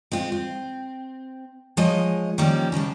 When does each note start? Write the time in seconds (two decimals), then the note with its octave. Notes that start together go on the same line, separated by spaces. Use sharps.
0.12 G#3 C4 F4
0.32 C4
1.77 F3 G#3 G#4 C#5 D#5
2.38 D#3 F3 G3 A#3 C#4
2.72 C#3 F3 G#3 D4